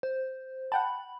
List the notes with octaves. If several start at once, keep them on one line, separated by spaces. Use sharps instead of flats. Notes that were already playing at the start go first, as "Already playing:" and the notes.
C5
F#5 G5 A5 B5